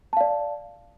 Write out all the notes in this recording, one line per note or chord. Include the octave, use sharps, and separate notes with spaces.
D5 F5 A5